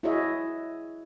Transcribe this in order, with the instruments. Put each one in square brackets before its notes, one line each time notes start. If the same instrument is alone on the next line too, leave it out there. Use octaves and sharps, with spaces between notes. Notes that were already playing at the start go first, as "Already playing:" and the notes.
[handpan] E4 F#4 G#4 C#5 D#5 E5